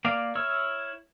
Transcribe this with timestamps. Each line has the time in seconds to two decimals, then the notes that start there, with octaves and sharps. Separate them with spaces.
0.05 A#3 D5 F5
0.35 E4 C#5 E6 F6